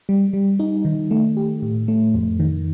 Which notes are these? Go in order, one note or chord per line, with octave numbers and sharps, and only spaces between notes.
G3
G3
D#4
D#3
A3
G4
A2
A3
F2
D#3